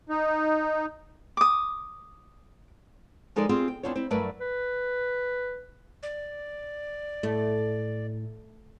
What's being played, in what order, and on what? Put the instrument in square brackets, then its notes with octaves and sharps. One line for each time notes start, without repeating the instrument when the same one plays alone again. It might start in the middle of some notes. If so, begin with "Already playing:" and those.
[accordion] D#4
[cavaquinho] D6 D#6
[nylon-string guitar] F3 G#3 D#4 A4 A#4 D5
C4 F4 G4 G#4
G5
E2 G2 C4 D4 F4 C#5
C4 E4
G2 F#3 A3 A#4 B4 D5
[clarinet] B4
[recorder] D5
[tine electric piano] A2 [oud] A3